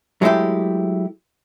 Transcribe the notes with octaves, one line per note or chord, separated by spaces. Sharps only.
F#3 G#3 A3 E4 G4